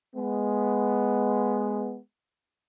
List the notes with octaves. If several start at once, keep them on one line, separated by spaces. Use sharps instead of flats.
G#3 B3